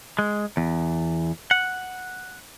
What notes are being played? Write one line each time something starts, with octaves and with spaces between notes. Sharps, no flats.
G#3
E2
F#5